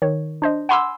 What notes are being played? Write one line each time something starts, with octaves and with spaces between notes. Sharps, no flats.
D#3 C#5
D4 C5 D#5
F#5 G#5 B5 C6 D6 E6